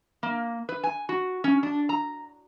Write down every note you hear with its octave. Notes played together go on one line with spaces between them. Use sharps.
A#3
B4
G#5
F#4
C#4
D4
A#5